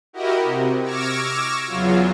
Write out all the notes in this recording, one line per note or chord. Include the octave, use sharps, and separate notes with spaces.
E4 F#4 G4 A#4 D#5
C3
C#6 D6 E6 F6 G#6 A#6
E2 C#3 F#3 F4